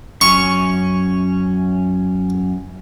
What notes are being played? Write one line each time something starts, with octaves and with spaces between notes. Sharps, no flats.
F#2 C#4 C#6